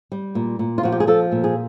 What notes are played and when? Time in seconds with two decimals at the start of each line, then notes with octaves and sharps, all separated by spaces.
0.12 G3
0.35 A#2
0.59 A#2
0.78 F4
0.83 F3 F#4
0.92 G4
1.00 G#4
1.07 F3 A4
1.32 A#2
1.44 G#4